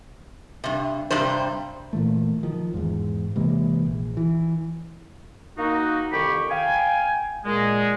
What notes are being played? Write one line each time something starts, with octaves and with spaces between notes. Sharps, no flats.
G2 C3
G2 C3 G3 C5
A#2 E3 A3
D#3 F3
E2 G#2
C3 E3 G#3 A#3
A#1
E3
A#3 D#4 F#4
C2 F2 D#3 G4 B5 C#6
F5 G5 G#5
A#2 G#3